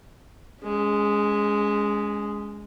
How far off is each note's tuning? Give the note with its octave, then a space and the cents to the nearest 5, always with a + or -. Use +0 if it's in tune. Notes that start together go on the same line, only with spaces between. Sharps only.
G#3 +0 C#4 +30